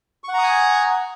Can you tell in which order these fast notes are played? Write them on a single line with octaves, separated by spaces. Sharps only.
C#6 F#5 A#5 D#6 G#5